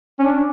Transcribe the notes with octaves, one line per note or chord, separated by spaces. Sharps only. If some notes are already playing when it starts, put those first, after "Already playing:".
C#4
D4